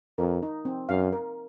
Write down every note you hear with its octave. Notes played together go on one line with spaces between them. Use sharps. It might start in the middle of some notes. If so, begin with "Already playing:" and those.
F2 A#4
D#4
C4
F#2 F5
A#4